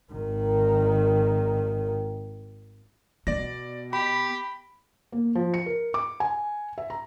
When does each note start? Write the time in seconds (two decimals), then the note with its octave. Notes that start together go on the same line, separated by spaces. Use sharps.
0.13 G#1 D#3
3.27 B2 B3 D5 A#6
3.93 G4 B5
5.12 A#3
5.35 F3
5.54 C#7
5.66 A#4
5.94 D6
6.20 G#5
6.78 E5
6.90 A#5